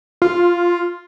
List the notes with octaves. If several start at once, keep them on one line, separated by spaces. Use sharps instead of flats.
F4